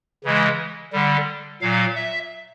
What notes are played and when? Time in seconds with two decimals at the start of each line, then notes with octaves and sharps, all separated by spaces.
0.24 C#3 E3 G#3
0.93 D3 G3
1.61 A#2 F#3 F5
1.95 E5